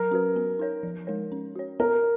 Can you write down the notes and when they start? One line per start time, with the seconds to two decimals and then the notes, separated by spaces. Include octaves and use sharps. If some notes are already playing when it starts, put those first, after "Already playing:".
Already playing: F#3 A#4
0.11 C#4 F#4 B4
0.36 B3
0.59 D#4 A#4 C#5
0.83 F3
1.07 G#3 D#4 A#4 C#5
1.32 C#4
1.56 F#4 C#5
1.80 B3 A#4